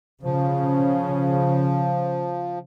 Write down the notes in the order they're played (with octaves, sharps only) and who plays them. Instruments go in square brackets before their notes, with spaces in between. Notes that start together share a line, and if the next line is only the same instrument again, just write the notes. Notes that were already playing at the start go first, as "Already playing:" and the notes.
[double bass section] C#3 [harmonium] F3